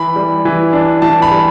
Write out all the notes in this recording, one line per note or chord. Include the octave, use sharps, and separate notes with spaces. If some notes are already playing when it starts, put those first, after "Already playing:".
Already playing: E3 B5
G3
E3
D4
E3 A5
B5
G3